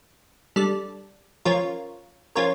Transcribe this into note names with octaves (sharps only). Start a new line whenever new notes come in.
G3 D4 A4 D5
F3 C#4 F4 A#4 C#5
F3 C#4 F4 A#4 C#5